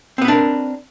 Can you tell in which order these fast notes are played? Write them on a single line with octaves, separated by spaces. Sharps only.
C4 B3 B4 D4 A#4